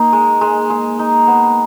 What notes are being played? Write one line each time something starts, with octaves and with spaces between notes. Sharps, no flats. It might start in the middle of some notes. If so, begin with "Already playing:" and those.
Already playing: A#3 D#4
G#3
G#3
G#3
D#4
B3